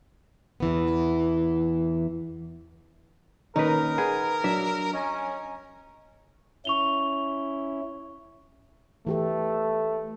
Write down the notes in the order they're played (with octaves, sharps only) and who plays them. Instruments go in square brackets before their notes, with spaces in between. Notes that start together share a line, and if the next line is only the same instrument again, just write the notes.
[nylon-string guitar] E2 E3 B3
[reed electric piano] D#3 A#3 C#4 [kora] D#4 B4 [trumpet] A#4
[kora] G#4 [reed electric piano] B4 F#5
[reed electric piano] F#3 D4 [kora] E5
[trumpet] C#4 [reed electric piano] D#5 G#5 A#5
[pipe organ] C#4 E4 [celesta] C#6 F7 G7
[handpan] E3 G4 A4 [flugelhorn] A3